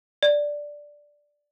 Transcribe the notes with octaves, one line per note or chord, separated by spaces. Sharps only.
D5